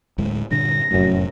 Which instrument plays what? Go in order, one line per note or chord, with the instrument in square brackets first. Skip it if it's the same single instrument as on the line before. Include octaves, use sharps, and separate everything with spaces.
[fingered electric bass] D1 A2 G#3
[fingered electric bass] G2 A#2 D3 [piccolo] A#6
[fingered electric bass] F1 A2 [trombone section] F#2